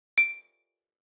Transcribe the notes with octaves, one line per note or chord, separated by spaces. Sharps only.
D7